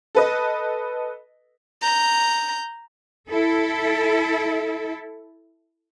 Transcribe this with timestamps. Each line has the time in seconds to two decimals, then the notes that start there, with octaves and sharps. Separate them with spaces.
0.15 A4 B4 D#5
1.81 A#5 G6
3.29 E4 A4